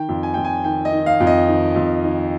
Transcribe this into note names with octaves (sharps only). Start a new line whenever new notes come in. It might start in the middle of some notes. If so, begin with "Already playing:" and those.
Already playing: D#3 G5
F2
G#5
F2 G5
G#5
D#3 G5
D#5
D#3
F5
F2
D#5
D#3
F2
D#3